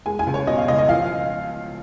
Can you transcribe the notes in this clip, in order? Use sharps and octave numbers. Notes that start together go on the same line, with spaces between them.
G#3 G#5
G#5
C#2
C#5
B2 D#5
F5
C#2 D#5
D#5
F3 F5